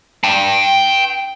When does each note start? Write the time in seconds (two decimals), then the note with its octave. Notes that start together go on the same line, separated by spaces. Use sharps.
0.24 G5 A5